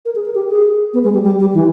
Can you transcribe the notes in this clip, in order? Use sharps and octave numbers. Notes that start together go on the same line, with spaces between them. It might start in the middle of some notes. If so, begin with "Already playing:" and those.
A#4
G#4
A#4
G4
G#4
B3
G#3
G3
G3
G3
E3